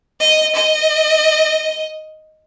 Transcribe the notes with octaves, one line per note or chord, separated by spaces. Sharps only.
D#5
D#5